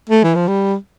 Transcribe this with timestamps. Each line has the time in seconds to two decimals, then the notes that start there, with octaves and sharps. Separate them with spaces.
0.09 A3
0.24 E3
0.35 F3
0.48 G3